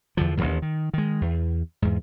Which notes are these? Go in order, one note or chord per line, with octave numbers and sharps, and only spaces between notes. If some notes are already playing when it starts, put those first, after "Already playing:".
E2 D3 F3
A1 D#2 G#2
D#3
D#3 G#3
E2
E2 G#2